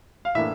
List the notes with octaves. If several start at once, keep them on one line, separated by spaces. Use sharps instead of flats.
F5
A2 E3 A#3 D4 E5